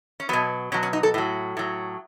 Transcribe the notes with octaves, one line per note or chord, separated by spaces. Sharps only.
C#4
B2 F#3 B3
B2 F#3 C#4
C#4
D#4
A4
A2 F#3
A2 F#3